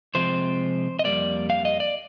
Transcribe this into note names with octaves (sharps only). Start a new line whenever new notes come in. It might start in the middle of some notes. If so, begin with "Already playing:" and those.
C3 F3 G#3 C4 C5
D#5
F2 D#3 G3 A#3 D5
F5
D#5
D5